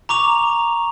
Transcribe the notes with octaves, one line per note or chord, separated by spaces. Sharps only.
A#5 C#6 D6 F7